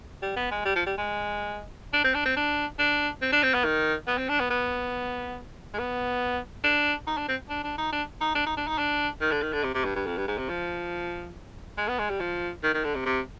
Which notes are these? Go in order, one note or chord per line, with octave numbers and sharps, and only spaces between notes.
G3
B3
G#3
G3
F3
G3
G#3
D4
C4
D4
C4
D4
D4
C4
D4
C4
B3
D#3
B3
C4
D4
B3
B3
G#3
B3
D4
D#4
D4
C4
D4
D4
D#4
D4
D#4
D4
D#4
D4
D#4
D4
D#3
D3
D#3
D3
C3
C3
G2
G2
F2
G2
G#2
C3
F3
G#3
B3
G#3
G3
F3
D#3
D#3
D3
C3
C3